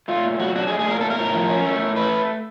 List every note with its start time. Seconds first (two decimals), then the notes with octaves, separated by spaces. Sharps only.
0.08 A3 F4
0.24 A#2
0.39 F#3 F#4
0.56 D4 F#4
0.67 G#4
0.71 A3
0.79 G#4
0.87 A#2 A#4
1.01 A3 A4
1.10 A#4
1.19 A2
1.34 F3
1.50 C#4
1.65 A3
1.81 A2
1.96 A3 B4